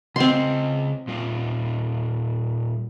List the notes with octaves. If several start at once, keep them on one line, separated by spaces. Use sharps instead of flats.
C#3 C4 D#5 F5 C6
A#2 G3 F4